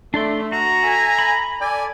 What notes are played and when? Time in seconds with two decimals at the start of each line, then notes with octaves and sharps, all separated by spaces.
0.14 A3 D4 D5 C6
0.52 F#4 A#5
0.83 A4 E5 G#5
1.19 B5
1.61 A4 D5 G#5